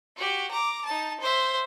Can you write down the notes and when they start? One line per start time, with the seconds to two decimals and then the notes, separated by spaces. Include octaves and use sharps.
0.17 F#4 G4
0.51 A#5 D6
0.86 D#4 A5
1.20 C5 E5